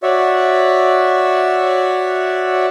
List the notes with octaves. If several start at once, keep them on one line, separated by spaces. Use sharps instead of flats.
F#4 C#5 D5 E5